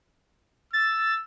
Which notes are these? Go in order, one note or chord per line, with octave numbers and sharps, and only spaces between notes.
E6 A6